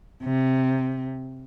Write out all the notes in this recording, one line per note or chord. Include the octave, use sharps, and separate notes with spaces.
C3